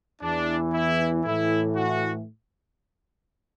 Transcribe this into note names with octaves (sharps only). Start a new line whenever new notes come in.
E2 E3 D4
E4
A2 E3 E4
F#4